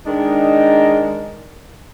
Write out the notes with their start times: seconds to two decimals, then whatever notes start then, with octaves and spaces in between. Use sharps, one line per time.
0.05 D#3 G#3 D4 D#4